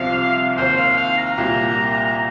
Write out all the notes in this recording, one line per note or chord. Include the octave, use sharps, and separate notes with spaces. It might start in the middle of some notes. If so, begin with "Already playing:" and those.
Already playing: C2 C3 F3 C4 F5
D#2 D#3 C4 C5
F5
F5
A#5
C2 A#2 A#3 G4
A#5